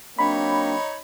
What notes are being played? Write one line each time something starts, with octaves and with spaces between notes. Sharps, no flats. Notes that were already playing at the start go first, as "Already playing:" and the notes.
F#3 A#3 C4 D4 D#4 C#5 B5